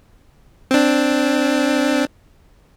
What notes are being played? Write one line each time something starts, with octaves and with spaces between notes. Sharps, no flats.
C4 D4